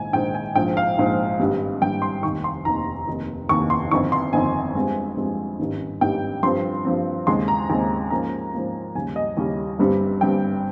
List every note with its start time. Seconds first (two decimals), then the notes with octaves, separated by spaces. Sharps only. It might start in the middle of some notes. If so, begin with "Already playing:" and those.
Already playing: A#1 G#2 D#3 G#5
0.13 A#1 G#2 D#3 G5
0.34 G#5
0.55 A#1 G#2 F3 G5
0.77 F5
0.98 A#1 G#2 F3
1.39 G#1 G2 G3
1.81 G#1 G2 G3 G5
2.02 C6
2.23 F1 D#2 D#3 C#6
2.44 C6
2.65 F1 D#2 D#3 A#5
3.07 F1 D#2 D#3
3.49 F1 D#2 D#3 C#6
3.70 C6
3.91 G1 F2 D#3 C#6
4.12 C6
4.33 G1 F2 D#3 G#5
4.75 G2 F3 G#3 C4
5.17 G2 F3 G#3 C4
5.59 G#1 G2 D#3 G3 C#4
6.01 G#1 G2 D#3 G3 C#4 G5
6.43 G2 F3 C4 C6
6.85 G2 F3 C4
7.27 D#2 C#3 G#3 C4 C6
7.48 A#5
7.69 D#2 C#3 G#3 C4
8.10 G#2 F3 A#3 C#4 A#5
8.53 G#2 F3 A#3 C#4
8.95 D#2 C#3 G3 C#4 G#5
9.16 D#5
9.37 D#2 C#3 G3 C#4
9.79 G1 G2 G3 C4
10.21 G1 G2 G3 C4 G5